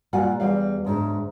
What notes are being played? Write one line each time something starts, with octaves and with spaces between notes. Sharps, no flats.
A#2 G3 F4 F#5 G#5
E2 G3 F5
D2 G#2